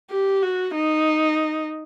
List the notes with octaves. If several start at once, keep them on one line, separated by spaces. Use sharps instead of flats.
G4
F#4
D#4